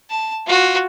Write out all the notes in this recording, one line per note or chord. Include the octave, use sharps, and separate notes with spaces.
A5
F4 F#4